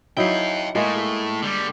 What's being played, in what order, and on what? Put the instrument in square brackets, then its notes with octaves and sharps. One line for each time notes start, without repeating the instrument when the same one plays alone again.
[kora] F#3 D#4 E4 [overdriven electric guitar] F5 G5
[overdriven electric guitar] A2 [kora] G#3 A#3 G#4
[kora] G#4
[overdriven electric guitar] D3 G3